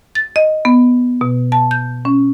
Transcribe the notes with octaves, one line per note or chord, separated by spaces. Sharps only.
A6
D#5
B3
B2
A5
G6
C#4